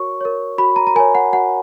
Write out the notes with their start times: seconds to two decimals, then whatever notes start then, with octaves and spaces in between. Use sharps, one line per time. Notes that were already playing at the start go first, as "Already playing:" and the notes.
Already playing: F#4 A#4 C#5 C#6
0.21 A#4 C#5
0.58 F#4 B5
0.76 A#5
0.87 A#5
0.95 A#4 C#5 G#5
1.15 F#5
1.33 F#4 F#5